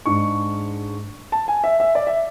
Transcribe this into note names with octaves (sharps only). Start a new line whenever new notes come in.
G#2 G#3 D4 C#6
A5
G#5
E5
E5
D5
E5